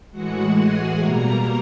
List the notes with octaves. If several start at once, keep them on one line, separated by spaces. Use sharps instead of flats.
A2 E3 G#3 F#4 F#5
G#4 G#5
B2 G3 A#3 A#4 A#5